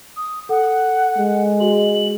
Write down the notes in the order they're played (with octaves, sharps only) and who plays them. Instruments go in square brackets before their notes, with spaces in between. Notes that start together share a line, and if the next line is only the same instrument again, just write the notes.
[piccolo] D#6
[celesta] A4 [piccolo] F#5
[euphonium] G#3
[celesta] F#4 [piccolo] F#7